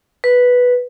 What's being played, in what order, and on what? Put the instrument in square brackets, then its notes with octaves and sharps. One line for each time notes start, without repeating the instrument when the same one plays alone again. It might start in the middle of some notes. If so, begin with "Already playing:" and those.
[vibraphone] B4